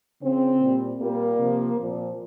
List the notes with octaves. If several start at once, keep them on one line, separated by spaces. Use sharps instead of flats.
C#3 F3 C4
A#2 G3
A#2 G3 A#3
C3 F3
A#2 F3